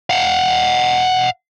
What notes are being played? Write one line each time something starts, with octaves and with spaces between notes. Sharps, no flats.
F5 F#5